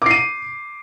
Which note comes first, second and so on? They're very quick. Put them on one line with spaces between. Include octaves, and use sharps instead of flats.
D6 C7 D#7